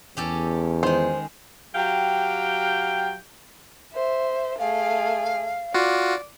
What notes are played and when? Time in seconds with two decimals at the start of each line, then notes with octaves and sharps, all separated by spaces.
0.17 E2 C#4 G4 A4
0.83 D#3 G#3 C5
1.75 F#3 G4 F5 G5
3.93 C5 E5
4.59 A3 G#4 F5
5.74 F4 F#4 D5